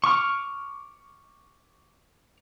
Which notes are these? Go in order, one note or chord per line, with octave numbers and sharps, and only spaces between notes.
C#6 D6 F6